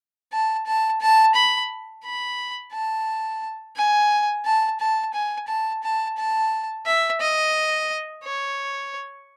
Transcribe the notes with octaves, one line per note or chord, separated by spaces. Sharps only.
A5
A5
A5
B5
B5
A5
G#5
A5
A5
G#5
A5
A5
A5
E5
D#5
C#5